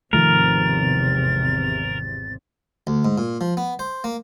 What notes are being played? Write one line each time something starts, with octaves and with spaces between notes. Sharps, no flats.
G#1 E2 C3 D#3 F3 A3 A#4 A6
D2
G#2
A#2
F3
B3
C5
A#3